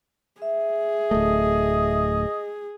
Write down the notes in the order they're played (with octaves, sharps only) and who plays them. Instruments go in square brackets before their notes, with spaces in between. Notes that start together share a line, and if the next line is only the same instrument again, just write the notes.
[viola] G#4 [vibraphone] E5
[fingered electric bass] D1 A3 [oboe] D#5